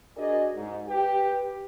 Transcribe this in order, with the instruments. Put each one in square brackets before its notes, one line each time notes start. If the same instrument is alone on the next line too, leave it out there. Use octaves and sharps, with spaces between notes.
[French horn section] D4 F#4 G#4 A#4 D5 D#5
G#2
G4 B4